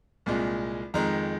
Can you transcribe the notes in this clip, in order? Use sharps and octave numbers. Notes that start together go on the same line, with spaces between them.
C2 A#2 G#3
F2 D#3 G#3 A#5